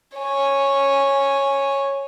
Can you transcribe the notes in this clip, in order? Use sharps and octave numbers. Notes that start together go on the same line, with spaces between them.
C#5 G#5